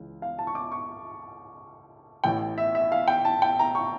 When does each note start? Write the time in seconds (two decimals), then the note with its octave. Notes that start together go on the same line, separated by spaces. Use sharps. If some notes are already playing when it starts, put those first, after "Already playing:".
Already playing: C#2 C#3 E3
0.22 F5
0.39 A5
0.47 C#6
0.55 D6
0.72 C#6
2.24 A1 A2 E3 G5
2.58 E5
2.75 E5
2.92 F5
3.08 G5
3.25 A5
3.42 G5
3.59 A#5
3.75 C#6